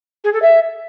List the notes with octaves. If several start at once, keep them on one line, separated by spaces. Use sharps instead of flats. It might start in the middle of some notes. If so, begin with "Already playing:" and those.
G#4
A4
E5